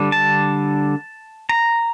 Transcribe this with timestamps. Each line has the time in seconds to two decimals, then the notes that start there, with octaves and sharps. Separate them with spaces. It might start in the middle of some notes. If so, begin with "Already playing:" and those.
Already playing: D3 G3 D4
0.12 A5
1.49 A#5